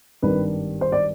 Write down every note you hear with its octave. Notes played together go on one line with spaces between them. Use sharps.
G#1 G2 D#3 G3 D4 B4
C5
D5